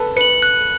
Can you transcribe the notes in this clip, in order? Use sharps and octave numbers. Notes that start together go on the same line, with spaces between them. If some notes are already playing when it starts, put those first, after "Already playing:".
Already playing: A4 B4
B4 C#7 F#7
F#6